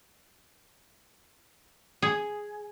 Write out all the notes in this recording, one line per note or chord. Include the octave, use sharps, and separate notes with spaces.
G#4